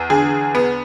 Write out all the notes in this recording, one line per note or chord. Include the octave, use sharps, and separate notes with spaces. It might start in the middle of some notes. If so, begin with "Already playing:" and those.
Already playing: E2
D3 G#4
B3